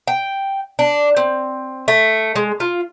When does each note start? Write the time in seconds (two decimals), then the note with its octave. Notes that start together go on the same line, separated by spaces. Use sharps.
0.08 G5
0.79 D4
1.17 C4
1.88 A3
2.36 G#3
2.60 F4